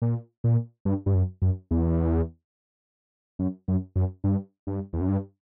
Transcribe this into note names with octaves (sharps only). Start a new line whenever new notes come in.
A#2
A#2
G2
G2
F#2
F#2
E2
F#2
F#2
F#2
G2
G2
E2
F#2
G2